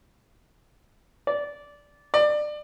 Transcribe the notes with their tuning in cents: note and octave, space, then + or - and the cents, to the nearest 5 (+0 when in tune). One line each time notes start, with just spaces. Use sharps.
D5 -15
D5 +25